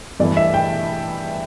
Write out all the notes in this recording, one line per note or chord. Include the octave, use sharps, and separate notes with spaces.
G2 E3 A3 E4 D5
E5
G5